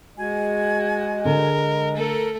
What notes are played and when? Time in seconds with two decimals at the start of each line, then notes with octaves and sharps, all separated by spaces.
0.17 G#3 F#4 G#5
1.25 D3 A#4
1.95 A3 A4 A#4